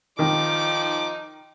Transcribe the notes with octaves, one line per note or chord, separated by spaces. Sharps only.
D#3 F3 D#4 D6